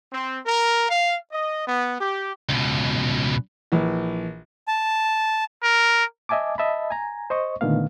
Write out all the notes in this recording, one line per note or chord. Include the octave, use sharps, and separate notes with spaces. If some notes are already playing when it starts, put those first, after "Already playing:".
C4
A#4
F5
D#5
B3
G4
C#2 B2
A#1 E3
A5
A#4
D#5 E5 G#5 A5 D6
D#5 E5 A5 B5
G#5 A#5
C5 D#5 C#6
A#2 D3 D#3 A3 B3 F5